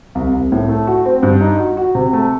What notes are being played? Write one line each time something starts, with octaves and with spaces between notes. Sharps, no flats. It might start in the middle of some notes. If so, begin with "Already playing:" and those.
C2
C2
A2
A3
F#4
C4
G2
D#4
F#4
F#4
C3
A3